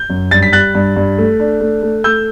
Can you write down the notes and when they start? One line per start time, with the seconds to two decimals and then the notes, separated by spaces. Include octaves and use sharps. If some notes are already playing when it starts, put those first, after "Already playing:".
Already playing: G6
0.10 F#2
0.31 G2 A6
0.43 B6
0.53 G3 F#6 A6
0.75 G2
0.97 G2
1.18 A3
1.40 D4
1.61 A3
1.83 A3
2.04 A3 E6 G6